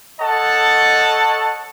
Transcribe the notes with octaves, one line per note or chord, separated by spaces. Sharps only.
A4 C#5 D#5 F#5 A5